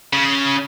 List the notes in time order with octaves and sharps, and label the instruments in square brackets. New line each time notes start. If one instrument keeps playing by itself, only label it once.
[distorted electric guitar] C#3